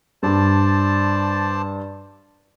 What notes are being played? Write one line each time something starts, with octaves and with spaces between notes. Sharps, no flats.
G2 C5 D5 A5